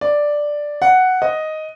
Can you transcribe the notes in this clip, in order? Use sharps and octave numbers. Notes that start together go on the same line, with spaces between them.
D5
F#5
D#5